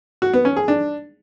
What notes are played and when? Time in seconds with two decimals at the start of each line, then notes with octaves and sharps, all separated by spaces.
0.22 F#4
0.33 B3
0.45 C#4
0.57 G#4
0.68 D4